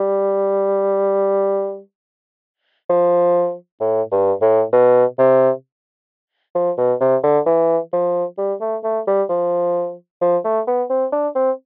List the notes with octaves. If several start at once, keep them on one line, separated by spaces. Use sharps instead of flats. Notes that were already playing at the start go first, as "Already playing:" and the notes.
Already playing: G3
F3
A2
G2
A2
B2
C3
F3
B2
C3
D3
E3
F3
G3
A3
A3
G3
F3
F3
A3
B3
C4
D4
C4